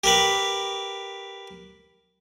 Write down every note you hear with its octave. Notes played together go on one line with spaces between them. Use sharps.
G4 A#4 B4